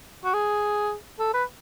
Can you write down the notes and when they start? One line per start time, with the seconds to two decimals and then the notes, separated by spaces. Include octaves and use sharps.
0.25 F#4
0.34 G#4
1.19 A4
1.34 B4